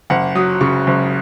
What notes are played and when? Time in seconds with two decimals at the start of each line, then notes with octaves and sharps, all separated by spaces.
0.10 F#1 F#5
0.35 F#3 D#6
0.61 C#3 C#6
0.87 F#1